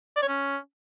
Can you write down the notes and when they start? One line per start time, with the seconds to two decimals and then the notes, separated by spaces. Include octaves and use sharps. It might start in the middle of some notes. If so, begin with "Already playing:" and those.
0.16 D5
0.22 C#5
0.28 C#4